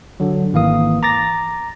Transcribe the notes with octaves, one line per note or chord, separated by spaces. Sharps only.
D3 F#3
G#1 E3 A#3 F5 D#6
A#5 D6 A6 A#6